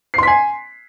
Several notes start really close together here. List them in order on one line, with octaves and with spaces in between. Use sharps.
C7 C6 B6 G#5